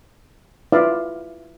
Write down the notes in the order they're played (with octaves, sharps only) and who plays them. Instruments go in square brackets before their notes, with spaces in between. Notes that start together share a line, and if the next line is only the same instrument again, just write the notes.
[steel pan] E4 F4 B4 D5 E5 F5